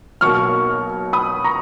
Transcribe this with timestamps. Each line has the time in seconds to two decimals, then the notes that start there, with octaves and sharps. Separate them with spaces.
0.21 B1 B2 A#3 C#6 F6
1.13 B5 D#6
1.44 A#5 C#6